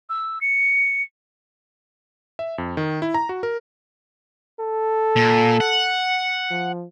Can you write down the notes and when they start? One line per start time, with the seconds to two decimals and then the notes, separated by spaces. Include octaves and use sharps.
0.10 E6
0.41 C#7
2.39 E5
2.58 F2
2.77 D#3
3.02 E4
3.14 A#5
3.29 F#4
3.43 A#4
4.60 A4
5.16 A#2
5.60 F#5
6.51 F3